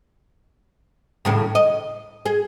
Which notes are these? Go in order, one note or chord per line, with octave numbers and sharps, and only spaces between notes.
D#2 A2 C#3
D#5
G#4